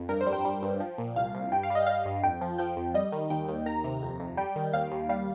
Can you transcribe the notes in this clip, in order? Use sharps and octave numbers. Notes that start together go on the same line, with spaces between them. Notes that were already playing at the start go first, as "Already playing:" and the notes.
Already playing: F2
G2 A#4
C5
G3
G5
G3
G2
F3
A#2
C2 F5
C2
G2 G5
F5
G3 D#5
G3 F5
G2
F2 G5
F3
F3 G5
F2
G3 D#5
D#3
D#2 G5
D#2
D#3 A#5
C3
F2
F2
G3 G5
D#3
D#2 F5
D#2
G3 F5